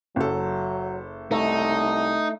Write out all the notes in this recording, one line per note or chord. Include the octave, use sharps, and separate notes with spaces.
F#1 F#3 A4
C2 A3 D#4